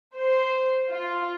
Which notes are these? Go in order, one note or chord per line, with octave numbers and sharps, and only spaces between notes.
C5
F4